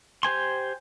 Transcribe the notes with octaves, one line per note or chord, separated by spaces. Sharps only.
G4 C5 G#5 C6